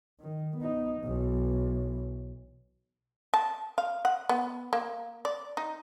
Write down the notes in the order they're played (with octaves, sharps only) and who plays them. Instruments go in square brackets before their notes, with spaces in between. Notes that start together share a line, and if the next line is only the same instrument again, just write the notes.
[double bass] D#3
B3 D#4
B1 E3
[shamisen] A5
F5
F#5
B3
A#3
D5
D#4